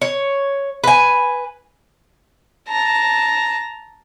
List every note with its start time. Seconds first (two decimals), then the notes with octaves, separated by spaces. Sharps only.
0.01 C#5
0.84 B4 G#5
2.69 A5 A#5